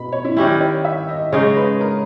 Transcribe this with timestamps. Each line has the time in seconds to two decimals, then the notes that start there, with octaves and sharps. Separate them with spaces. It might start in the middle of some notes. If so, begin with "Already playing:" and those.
Already playing: B2 B5
0.12 C#5
0.25 E4
0.37 D#3 G3 C#4 E4 G4
0.60 C#5
0.85 E5
1.09 D#5
1.32 C#3 G#3 D#4 C#5
1.56 B4
1.81 A#4